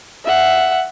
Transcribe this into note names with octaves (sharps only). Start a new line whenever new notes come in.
E5 F#5